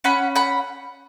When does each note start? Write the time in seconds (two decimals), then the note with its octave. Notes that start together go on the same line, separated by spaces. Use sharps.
0.04 C#4 F#5 B5
0.36 F#5 B5